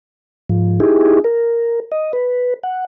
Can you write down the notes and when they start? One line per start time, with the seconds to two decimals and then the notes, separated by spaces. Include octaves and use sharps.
0.49 G#2 F3
0.80 D#4 E4 G4 G#4
1.24 A#4
1.92 D#5
2.13 B4
2.63 F#5